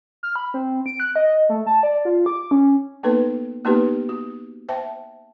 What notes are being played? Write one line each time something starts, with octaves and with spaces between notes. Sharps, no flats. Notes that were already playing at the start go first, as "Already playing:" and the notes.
F6
B5
C4
D7
F#6
D#5
A3
A5
D5
F4
D6
C#4
A#3 B3 D#4 A4 B4
A#3 B3 D#4 F#4 G4 B4
F#4
C5 E5 G5 A5